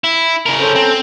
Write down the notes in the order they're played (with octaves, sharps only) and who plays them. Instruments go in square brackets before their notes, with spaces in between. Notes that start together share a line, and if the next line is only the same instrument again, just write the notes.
[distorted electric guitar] E4
C#3 A#4
[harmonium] C#4 A4 C5
[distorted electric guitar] C4